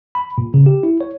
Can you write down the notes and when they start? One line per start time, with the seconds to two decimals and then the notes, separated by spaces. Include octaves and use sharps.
0.15 B5
0.38 A#2
0.54 C#3
0.66 G4
0.83 E4
1.01 C#5